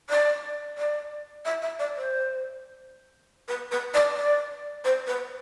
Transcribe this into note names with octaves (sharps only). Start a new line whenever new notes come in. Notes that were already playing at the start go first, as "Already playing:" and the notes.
D5
D5
E5
E5
D5
C5
B4
B4
D5
D5
C5
B4